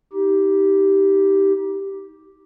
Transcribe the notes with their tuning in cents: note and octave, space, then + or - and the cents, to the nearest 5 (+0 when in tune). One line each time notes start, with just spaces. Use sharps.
D#4 +30 G4 -5